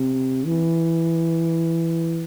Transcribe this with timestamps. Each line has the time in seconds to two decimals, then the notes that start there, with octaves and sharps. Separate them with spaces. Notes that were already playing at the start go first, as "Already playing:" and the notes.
Already playing: C3
0.45 E3